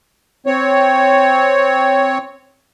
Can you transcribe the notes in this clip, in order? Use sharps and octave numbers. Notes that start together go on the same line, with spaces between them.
C4 C#5